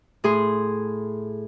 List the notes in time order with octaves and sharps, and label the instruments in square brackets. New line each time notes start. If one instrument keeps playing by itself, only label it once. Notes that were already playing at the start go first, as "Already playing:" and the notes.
[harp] A2 G#4 C6